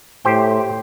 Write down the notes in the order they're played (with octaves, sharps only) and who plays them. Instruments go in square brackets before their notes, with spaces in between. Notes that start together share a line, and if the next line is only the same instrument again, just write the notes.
[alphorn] A2 [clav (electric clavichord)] G4 C5 G5